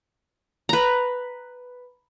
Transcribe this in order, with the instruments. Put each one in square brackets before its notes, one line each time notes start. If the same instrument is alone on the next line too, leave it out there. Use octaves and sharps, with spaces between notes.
[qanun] B4 A#5